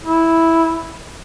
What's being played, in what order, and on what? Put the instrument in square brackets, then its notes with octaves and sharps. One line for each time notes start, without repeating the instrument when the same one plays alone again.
[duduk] E4